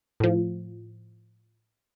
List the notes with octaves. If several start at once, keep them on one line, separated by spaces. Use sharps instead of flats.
A2 F3